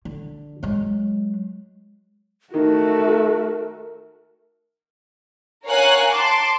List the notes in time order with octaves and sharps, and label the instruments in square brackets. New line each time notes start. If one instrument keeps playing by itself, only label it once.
[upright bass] D3
F#3 G#3
[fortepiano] D#3 [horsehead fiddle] A3 F#4 [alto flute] A#4
[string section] A#4 C#5 F5 F#5 G#5 F#6
A5 C6 D6